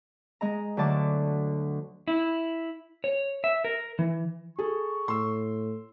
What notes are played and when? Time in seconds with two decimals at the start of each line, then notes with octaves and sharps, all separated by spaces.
0.41 G#3 D#5 A#5
0.77 D2 D3 F#3 A5 D6
2.08 E4
3.04 C#5
3.44 E5
3.64 A#4
3.99 E3
4.59 G#4 A4 C#6
5.08 A2 C6 E6